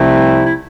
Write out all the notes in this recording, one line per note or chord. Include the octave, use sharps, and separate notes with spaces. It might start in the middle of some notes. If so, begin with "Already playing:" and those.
Already playing: C2 C3 F3 A3 C4 E4
E4